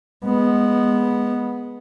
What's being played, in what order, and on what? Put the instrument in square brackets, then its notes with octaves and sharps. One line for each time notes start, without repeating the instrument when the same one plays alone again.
[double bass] G#3 B3